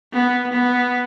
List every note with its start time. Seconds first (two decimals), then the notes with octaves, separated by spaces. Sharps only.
0.13 B3
0.53 B3